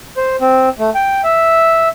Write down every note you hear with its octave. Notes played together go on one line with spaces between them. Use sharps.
C5
C4
A3
G5
E5